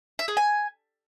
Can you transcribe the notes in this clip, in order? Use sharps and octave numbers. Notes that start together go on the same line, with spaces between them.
E5
G#4
G#5